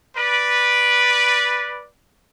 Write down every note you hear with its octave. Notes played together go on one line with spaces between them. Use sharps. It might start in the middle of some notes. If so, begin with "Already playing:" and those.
B4 D5